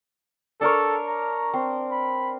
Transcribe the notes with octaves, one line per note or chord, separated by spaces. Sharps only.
D4 A4 A#4 C#5
A#5
C4
B5